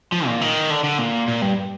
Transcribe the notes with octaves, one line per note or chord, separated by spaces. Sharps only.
F3
A#2
D#3
D3
D3
A#2
A#2
G2